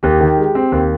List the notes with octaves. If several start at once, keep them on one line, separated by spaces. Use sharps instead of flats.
D#2 G4
D#3
G#3
C4
D#2